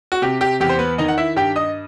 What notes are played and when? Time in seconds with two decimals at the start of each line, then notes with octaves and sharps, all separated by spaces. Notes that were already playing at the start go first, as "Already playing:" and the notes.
0.12 F#4
0.22 C3 G4
0.41 G4
0.60 E2 G4
0.69 C5
0.79 B3 B4
0.98 D#3 D#4 D#5
1.08 F#5
1.18 E4 E5
1.36 G2 G4 G5
1.56 D#5 D#6